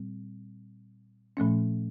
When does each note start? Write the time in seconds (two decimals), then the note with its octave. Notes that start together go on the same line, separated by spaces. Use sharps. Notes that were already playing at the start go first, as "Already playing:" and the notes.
Already playing: A#2 G3 C4
1.37 A#2 F3 A3 C#4